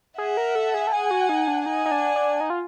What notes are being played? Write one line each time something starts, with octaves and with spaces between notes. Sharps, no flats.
G#4 E5 F#5
A#4
A4
G#4
A4
G#4 F#5 G#5
F#4
D#4
D4
D#4 F#5 G#5
D#4
D4
D4
D#4
F4